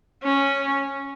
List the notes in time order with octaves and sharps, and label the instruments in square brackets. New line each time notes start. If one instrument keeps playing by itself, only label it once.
[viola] C#4